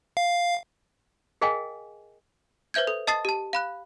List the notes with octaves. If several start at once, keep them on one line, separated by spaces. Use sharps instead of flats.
F5
G#4 A#4 D#5 F5 G5 G#5
B4 C5 E5 G6 G#6
A4
D#5 A5 D#6 A6 C7
G4 A5
F5 B5 F#6